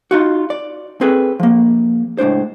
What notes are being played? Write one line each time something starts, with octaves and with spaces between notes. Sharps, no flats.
D#4 F4 F#4
D5
C4 G#4 A4 B4
F3 A#3
C#2 A2 D4 C5